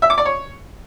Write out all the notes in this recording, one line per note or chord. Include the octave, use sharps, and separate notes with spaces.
E5
D6
D5
C#5